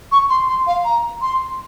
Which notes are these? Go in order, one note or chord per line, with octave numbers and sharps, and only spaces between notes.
C#6
C6
C6
F5
A#5
C6